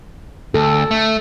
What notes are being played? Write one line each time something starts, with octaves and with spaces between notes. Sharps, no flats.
D2 A4
A3